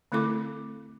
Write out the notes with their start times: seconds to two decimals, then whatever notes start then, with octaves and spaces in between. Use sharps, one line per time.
0.12 D3 A3 C4 E4 A4 D6